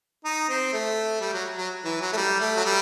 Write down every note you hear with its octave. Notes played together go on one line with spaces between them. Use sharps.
D#4
C4
A3
G3
F#3
F#3
E3
F#3
A3
G3
A3
F#3
G3